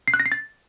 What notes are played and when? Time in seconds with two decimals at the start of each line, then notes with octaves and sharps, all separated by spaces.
0.08 C7
0.14 F#6
0.20 A#6
0.26 C7
0.32 A6